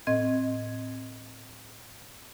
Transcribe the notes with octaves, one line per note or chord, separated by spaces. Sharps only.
A2 C4 D#5 G#6